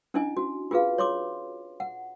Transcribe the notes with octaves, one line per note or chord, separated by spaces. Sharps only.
C#4 D4 E4 D#5 G#5
F#4
F4 F#4 G#4 B4 F5
C#5 C6 D6
F#5